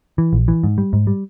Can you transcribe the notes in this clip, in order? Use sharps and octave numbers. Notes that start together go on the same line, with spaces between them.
E3
A#1
E3
G#2
G3
G#2
G3